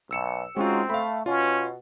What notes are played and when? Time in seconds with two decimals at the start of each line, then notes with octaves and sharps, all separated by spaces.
0.11 B1 E6 C#7 E7
0.57 G#3 C4 C#4 D#4 F4 F#4
0.90 A3 F5 B5
1.26 B2 C#4 F4